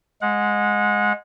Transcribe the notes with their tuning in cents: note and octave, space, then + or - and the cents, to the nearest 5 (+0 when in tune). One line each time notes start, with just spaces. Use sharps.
G#3 +0 F#5 -30